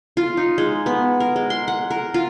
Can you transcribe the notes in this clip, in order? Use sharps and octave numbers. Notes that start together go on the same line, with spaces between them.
F4
D#4
G#3
B3
A#4
G#3
C6
F#5
A#4
F4